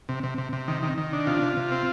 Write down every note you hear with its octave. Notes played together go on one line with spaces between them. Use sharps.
C3
C3
C3
C3
D#3
D#3
D#3
D4
C3 F4
C3
C3
C4